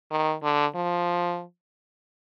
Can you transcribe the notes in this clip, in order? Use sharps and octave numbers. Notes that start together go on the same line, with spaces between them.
D#3
D3
F3